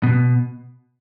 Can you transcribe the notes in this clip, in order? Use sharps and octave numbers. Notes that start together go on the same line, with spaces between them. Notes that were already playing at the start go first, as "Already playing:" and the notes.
B2